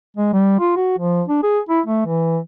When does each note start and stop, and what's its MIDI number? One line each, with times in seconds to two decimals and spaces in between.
0.17 0.31 56
0.33 0.55 55
0.60 0.71 65
0.76 0.97 66
0.98 1.22 53
1.28 1.41 62
1.43 1.59 68
1.69 1.81 64
1.86 2.04 57
2.06 2.38 52